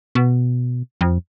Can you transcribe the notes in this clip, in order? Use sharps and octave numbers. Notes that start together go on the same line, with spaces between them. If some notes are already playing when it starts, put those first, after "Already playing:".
B2
F2